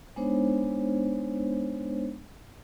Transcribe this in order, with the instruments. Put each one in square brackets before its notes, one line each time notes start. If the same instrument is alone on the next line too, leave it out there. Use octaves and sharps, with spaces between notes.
[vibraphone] G#3 B3 D4 D#4 C5 C#5